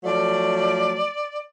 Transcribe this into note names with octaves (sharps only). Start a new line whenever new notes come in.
F3 F#3 A3 D5